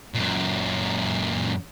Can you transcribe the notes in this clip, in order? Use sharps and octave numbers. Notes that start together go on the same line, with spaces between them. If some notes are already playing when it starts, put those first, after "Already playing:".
F#2 A#2